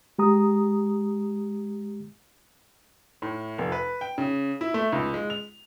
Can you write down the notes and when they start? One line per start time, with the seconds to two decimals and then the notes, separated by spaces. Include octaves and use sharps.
0.19 G#3 G4 A#5 D#6
3.22 A2
3.58 F1
3.72 B4
4.01 G5
4.18 C#3
4.61 E4
4.74 A3
4.93 C#2
5.14 G#3
5.30 F7